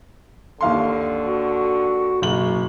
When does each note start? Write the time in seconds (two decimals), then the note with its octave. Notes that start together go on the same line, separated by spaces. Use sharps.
0.61 D#2 D3 F5 C6
1.26 F#4
2.22 F#1 B2 F#7